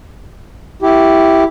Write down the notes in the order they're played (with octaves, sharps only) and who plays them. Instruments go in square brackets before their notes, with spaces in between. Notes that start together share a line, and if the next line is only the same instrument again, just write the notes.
[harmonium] E4 G4